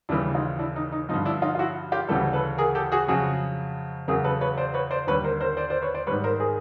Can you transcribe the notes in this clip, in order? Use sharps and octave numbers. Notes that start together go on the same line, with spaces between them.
D#2 C#3 E3 G3 D4 E4
D#4 F4
D4 E4
D#4
D#4
G2 D3 F3 D#4
D4 E4
D#4 F4
F4
E4 F#4
F4 G4
D2 C#3 E3 G3 G4 A4
A4 B4
G#4 A#4
G4 A4
F#4 G#4
F2 C#3 F#3 F#4 G#4
E2 C#3 F#3 G#4 A#4
A4 B4
B4 C#5
C5 D5
B4 C#5
C5 D5
D#2 D3 G3 B4 C#5
A#4 C5
A#4 C5
C5 D5
C5 D5
B4 C#5
C5 D5
G#2 D#3 G3 B4 C#5
A#4 C5
G#4 A#4